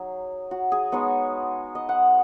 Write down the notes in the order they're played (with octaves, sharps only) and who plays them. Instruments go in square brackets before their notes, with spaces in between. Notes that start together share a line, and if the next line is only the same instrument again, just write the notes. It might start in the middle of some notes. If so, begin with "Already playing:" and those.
Already playing: [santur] F#3 D#4 G#4
F#4
G#4
G#3 B3 D#4 C#5
D#5
F#5